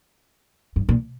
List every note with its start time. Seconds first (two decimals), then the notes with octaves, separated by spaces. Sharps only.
0.76 G2
0.89 A#2